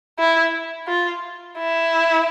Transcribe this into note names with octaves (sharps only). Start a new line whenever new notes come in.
E4
F4
E4